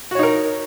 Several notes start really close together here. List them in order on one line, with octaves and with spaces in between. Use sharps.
F#4 C#5 D#4 A#4